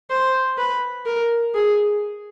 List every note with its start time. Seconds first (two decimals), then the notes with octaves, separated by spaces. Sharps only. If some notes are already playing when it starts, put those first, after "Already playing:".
0.10 C5
0.58 B4
1.06 A#4
1.55 G#4